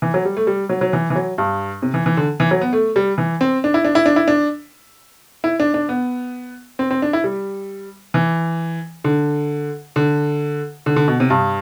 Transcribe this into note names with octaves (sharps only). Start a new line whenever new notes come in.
E3
F#3
G3
A3
G3
F#3
F#3
E3
E3
F#3
G2
C3
E3
E3
D3
E3
F#3
B3
A3
G3
E3
C4
D4
E4
D4
E4
D4
E4
D4
E4
D4
D4
B3
C4
C4
D4
E4
G3
E3
D3
D3
D3
D3
B2
C3
G2